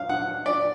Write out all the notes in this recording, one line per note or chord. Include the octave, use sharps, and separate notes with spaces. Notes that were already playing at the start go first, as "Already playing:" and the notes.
Already playing: F5
F#5
D5